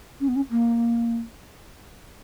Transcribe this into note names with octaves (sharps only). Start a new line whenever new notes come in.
C#4
B3
C#4
A#3